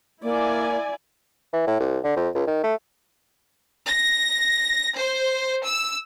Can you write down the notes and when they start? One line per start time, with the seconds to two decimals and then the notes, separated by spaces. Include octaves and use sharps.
0.23 A#3 E4 D5 G#5
1.53 E3
1.67 A2
1.80 C2
2.04 D3
2.17 F2
2.35 C#2
2.47 D#3
2.63 A3
3.88 A#6
4.97 C5
5.66 E6